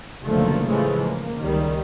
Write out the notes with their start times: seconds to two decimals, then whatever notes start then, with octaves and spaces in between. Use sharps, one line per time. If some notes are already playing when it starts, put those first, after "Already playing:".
0.24 F#1 B1 D3 F3 A3 A#3
0.67 A2 C#3 E3 F3 G#3 A3
1.03 A#3
1.41 C#2 D#3 G3